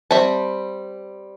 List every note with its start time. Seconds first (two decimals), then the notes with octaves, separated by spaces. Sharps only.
0.11 G3 C4 E5 A5